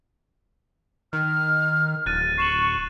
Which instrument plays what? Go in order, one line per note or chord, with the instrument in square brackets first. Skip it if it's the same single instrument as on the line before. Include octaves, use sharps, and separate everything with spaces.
[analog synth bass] D#3 [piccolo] F6
[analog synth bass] D1 [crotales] F#6 A6 D#7
[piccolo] C#6 [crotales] C7 E7 F#7